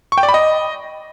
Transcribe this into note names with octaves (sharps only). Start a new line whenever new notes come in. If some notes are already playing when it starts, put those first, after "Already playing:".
C#6
G5
D5
B5
D#5